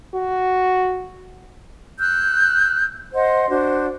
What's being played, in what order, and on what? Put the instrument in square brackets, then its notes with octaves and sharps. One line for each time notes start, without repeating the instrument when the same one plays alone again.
[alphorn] F#4
[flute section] E6 F#6 G6
C5 D#5 F#5 C6
D4 F#4 C5